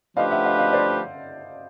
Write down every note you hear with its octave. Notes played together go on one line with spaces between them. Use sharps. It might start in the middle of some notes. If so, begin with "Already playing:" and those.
F3 A3 D4 G4 B4 D#5 F5
E5 F#5
D#5 F5
D#5 F5
C5 D5